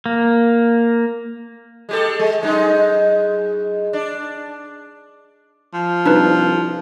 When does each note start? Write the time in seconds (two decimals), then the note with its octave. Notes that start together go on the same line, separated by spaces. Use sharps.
0.06 A#3
1.89 G#3 G4 A4
2.19 G#3
2.42 F#2 G#3 D#4
3.93 D4
5.74 F3
6.06 C2 D4 D#4 B4